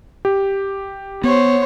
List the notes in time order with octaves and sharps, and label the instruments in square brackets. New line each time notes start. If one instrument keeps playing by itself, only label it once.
[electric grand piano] G4
[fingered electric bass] B3 [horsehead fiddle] C5 C#5